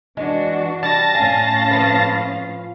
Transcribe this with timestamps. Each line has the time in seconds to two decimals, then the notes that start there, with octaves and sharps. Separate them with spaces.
0.17 E3 G#3 D4 F#4
0.83 G3 D5 A5 A6 A#6
1.15 A2 C#4 F5 G#5
1.71 F3 B4